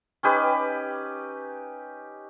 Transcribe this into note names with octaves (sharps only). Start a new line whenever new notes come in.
C#4 D#4 G4 B4